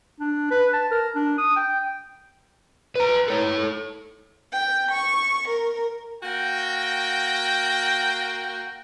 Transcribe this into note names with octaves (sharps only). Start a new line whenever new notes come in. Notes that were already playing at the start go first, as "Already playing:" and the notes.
D4
B4
A5
A#4
D4
D#6
G5
B4 A#5
A4 C#5
G5
C#6
A#4
A#3 F#4 G5